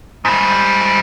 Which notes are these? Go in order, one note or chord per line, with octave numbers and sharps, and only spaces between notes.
G#2 G3